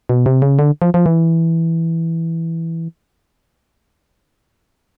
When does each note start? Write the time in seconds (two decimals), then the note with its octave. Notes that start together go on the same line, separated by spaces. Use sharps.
0.09 B2
0.26 C3
0.42 C#3
0.59 D3
0.82 F3
0.94 F3
1.06 E3